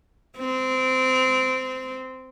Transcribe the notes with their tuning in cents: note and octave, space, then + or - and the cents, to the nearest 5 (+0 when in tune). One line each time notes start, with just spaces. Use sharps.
C4 -20